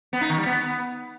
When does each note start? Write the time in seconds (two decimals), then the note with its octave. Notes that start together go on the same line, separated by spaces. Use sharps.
0.13 B3
0.21 D#4
0.29 D#3
0.38 G3
0.46 B3